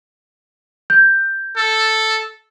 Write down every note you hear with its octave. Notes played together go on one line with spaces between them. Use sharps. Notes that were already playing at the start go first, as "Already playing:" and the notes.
G6
A4